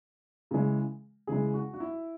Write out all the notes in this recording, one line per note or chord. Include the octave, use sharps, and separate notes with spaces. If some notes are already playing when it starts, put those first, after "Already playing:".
C#3 E3 G#3
C#3 E3 G#3 G#4
F#4
F#4
E4